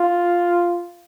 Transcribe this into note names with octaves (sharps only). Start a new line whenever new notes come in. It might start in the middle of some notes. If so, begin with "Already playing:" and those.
Already playing: F4